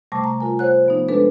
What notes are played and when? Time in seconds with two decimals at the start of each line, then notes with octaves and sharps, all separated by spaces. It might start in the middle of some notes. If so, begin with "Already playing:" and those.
0.12 C3 G3 A3 A5 C#6 D6
0.24 A#5
0.40 F4 A#4 G#5
0.59 C5 C#5 F#5 F#6
0.86 F3 B3 D#4
1.08 G#3 B3 D4 A4 B4